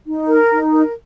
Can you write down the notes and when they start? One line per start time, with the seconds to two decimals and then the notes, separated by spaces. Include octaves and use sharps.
0.05 D#4
0.28 A#4
0.51 D#4
0.73 A#4